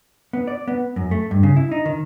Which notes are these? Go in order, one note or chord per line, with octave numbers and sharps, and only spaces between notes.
B3
D5
B3
F#2
A3
G2
C#3
E4
D#4
D#3